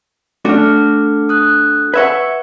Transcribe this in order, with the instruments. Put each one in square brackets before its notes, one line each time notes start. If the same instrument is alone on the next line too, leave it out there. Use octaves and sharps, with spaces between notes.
[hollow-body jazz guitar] A3 D4 F#4 [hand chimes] D6 F6
[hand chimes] D#6 F#6
[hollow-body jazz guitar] B4 E5 F#5 [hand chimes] C#6 G#6